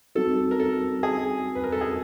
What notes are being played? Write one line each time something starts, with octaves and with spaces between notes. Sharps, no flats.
G3 C4 D#4 F#4 A4
A#4
A4
G#4
B4
A#4
A4
G#4